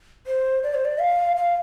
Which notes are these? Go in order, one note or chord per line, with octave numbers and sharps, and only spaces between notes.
C5
D5
C5
D5
F5
F5